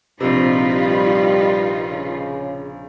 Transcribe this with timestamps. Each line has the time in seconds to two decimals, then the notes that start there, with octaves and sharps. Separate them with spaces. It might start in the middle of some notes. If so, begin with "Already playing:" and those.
0.20 A#1 C3 D#4 F4 B4
0.73 G3
1.91 C#3